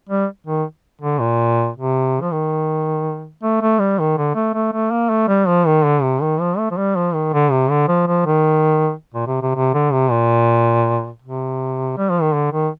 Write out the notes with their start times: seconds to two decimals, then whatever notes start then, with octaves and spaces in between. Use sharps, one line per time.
0.09 G3
0.47 D#3
1.01 D3
1.20 A#2
1.76 C3
2.21 F3
2.31 D#3
3.43 A3
3.61 A3
3.79 G3
3.99 D#3
4.17 D3
4.35 A3
4.54 A3
4.73 A3
4.91 A#3
5.10 A3
5.28 G3
5.47 F3
5.66 D#3
5.85 D3
6.02 C3
6.22 D#3
6.40 F3
6.58 A3
6.71 F3
6.77 G3
6.96 F3
7.14 D#3
7.33 D3
7.51 C3
7.70 D3
7.88 F3
8.07 F3
8.26 D#3
9.14 A#2
9.27 C3
9.42 C3
9.55 C3
9.74 D3
9.92 C3
10.11 A#2
11.22 C3
11.98 G3
12.10 F3
12.22 D#3
12.34 D3
12.52 D#3